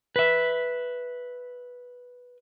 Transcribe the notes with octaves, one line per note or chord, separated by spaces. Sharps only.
B4 E5